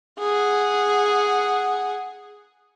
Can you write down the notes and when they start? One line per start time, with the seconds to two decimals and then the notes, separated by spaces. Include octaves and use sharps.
0.19 G#4 F#5